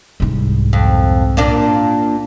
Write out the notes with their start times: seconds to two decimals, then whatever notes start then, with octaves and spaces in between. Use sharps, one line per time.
0.20 C2 G#2
0.73 F2
1.37 A#2 A#3 D4